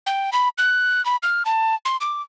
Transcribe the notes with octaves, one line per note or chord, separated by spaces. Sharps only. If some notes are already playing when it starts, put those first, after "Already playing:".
G5
B5
F#6
B5
F6
A5
C6
D6